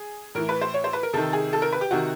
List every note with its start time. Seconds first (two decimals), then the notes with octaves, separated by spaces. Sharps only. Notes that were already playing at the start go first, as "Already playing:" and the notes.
Already playing: G#4
0.35 A2 E3 A#4
0.49 B4
0.62 C5
0.74 C#5
0.84 C5
0.93 B4
1.03 A#4
1.13 C3 D#3 A4
1.33 G#4
1.53 A4
1.62 A#4
1.73 B4
1.81 G4
1.91 C3 D#3 F#4